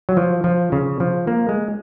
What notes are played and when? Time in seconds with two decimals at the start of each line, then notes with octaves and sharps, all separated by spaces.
0.09 F#3
0.17 F3
0.44 F3
0.72 C#3
1.00 F3
1.27 A#3
1.49 G#3